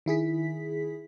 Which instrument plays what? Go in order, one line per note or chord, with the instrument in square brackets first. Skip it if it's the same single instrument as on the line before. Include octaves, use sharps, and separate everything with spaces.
[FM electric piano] D#3 E4 G#4 B6